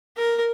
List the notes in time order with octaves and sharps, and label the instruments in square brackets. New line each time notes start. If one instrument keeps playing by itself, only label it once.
[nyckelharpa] A#4